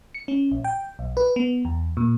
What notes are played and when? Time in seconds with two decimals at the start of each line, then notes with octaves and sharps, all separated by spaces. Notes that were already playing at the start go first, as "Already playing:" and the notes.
0.15 C#7
0.28 C#4
0.52 A#1
0.64 G5
0.99 B1
1.17 B4
1.36 B3
1.65 E2
1.97 A#2